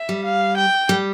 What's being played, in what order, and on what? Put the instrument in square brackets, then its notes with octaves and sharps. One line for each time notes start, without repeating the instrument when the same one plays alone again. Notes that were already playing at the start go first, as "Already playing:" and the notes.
Already playing: [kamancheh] E5
[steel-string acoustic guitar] G3
[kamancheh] F5
G5
[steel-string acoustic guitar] G3